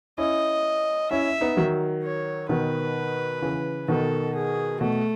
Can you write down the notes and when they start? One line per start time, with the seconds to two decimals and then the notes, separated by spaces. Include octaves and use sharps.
0.18 C#4 E4 D#5
1.11 C#4 E4 E5
1.41 B3 D#4
1.57 D#3 F#3
2.03 C#5
2.49 B2 D#3 B4
3.42 C#3 E3
3.88 B2 D#3 A4
4.35 G#4
4.81 B2 A3